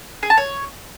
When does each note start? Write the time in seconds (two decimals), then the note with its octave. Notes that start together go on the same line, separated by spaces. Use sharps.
0.23 G#4
0.30 A5
0.37 C#5